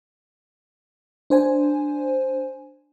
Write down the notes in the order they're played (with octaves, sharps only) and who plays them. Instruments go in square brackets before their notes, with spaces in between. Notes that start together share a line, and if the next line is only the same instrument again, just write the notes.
[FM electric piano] D4 C5 G#5